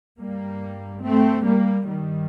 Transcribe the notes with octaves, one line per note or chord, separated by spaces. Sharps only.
G2 G3 A#3
A3 C4
G3 A#3
G2 D#3 G3